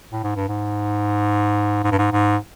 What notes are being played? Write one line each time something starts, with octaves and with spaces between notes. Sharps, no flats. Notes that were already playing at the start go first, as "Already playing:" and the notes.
A2
G#2
G2
G#2
G#2
G2
G#2
G#2